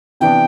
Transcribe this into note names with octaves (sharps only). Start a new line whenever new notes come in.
C3 E3 B3 D4 G5